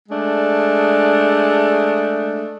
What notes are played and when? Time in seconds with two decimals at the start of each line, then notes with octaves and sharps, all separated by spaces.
0.09 G#3 A3 D4